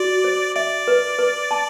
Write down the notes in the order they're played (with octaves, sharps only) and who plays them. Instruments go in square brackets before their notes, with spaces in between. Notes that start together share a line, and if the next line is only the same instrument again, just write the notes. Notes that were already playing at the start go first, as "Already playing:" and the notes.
Already playing: [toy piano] F#4 [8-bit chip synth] D5
[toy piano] C5
[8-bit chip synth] D5 [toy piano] E5
[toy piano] B4
B4
A5